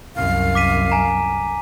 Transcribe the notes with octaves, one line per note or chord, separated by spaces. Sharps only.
C2 F#2 F5
D6 B6 D#7
G#5 A#5